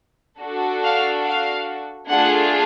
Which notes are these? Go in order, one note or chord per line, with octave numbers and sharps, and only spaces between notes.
D4 F#4 A4
F5
F5
A3 D4 F4 G#4 F#5